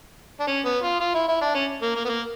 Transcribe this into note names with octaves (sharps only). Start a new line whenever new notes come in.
D4
C#4
B3
F4
F4
E4
E4
D4
C#4
A#3
A#3
B3
A#3